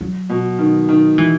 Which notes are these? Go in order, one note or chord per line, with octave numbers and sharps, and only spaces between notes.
F#3
B2
D#3
D#3
E3